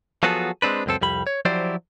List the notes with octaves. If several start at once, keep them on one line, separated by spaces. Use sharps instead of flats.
F3 F#3 B3 F#4 G#4 A4
G#3 C4 D4 B4
C#2 F#2 C4 A4
C2 F2 G3 B5
C#5
F3 F#3 E4 G4 C5 D5